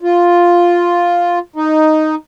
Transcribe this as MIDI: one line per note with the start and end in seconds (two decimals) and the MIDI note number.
0.01 1.39 65
1.56 2.15 63